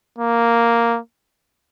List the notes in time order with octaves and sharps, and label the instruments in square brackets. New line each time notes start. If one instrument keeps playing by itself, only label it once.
[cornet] A#3